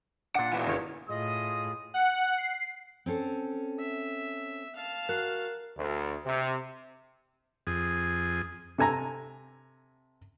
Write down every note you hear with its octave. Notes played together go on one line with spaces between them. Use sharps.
A#2 D4 F#5
B2 E3
G1 D#3 C#5
A2 F4 G#4 D#5 D#6
F#5
C7
C4 C#4 A4
E5
F5 A5
F#4 A#4 F#6
D2
C3
F2 G#4
C3 A4 G#5 A#5